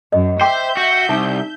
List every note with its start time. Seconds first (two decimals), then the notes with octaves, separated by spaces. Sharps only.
0.12 F#2 D#5
0.41 C5 E5 G5 D6 G6
0.77 F#4
1.09 C2 D#4